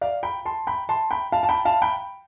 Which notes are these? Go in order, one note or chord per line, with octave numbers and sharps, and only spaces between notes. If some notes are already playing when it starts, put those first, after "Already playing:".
D5 F5
G5 B5
A5 C6
G5 B5
A5 C6
G5 B5
F5 A5
A5
G5 B5
F5 A5
G5 B5